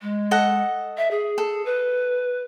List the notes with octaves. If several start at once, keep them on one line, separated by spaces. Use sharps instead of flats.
G#3
A4 D#5 F#5
E5
G#4
A4
B4